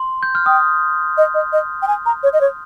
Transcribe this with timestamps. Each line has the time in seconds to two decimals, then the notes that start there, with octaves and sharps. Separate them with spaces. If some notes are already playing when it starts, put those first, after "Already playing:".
Already playing: C6
0.23 G6
0.35 F6
0.46 G5 D#6
1.18 D#5
1.34 D#5
1.53 D#5
1.82 G5
1.88 G#5
2.06 A#5
2.23 C#5
2.33 D#5
2.41 C#5